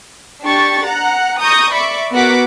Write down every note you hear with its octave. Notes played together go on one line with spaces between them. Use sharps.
D4 G4 C#6 A6
F#5 A#5
A#5 C#6 D#6 G6 A#6
D5 E5 B5 C#6 D6
B3 F#4 A#4 F#5 D6 B6